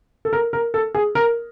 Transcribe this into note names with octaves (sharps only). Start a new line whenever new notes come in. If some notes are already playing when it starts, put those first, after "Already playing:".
A4
A#4
A#4
A4
G#4
A#4